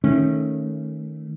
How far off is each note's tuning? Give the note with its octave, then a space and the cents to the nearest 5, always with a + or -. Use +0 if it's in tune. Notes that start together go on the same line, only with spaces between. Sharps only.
D#3 +0 A3 +0 C#4 -20